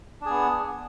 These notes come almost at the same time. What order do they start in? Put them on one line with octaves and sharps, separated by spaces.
D4 G#4 B3